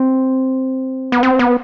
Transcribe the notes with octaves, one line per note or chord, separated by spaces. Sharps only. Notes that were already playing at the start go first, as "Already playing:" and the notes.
Already playing: C4
B3
C4
B3